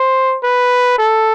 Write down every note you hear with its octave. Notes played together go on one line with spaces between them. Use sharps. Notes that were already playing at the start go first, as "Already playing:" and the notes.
Already playing: C5
B4
A4